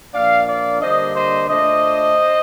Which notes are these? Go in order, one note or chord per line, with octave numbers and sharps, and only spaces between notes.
A#2 F3 A#3 D4 D5 F5
D5 F5
D3 G3 A#3 D4 C5 D#5
C5 D#5
A#2 A3 D4 C5 D#5